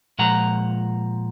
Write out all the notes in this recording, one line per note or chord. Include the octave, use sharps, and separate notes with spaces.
A#2 F3 G#3 F#5 A#5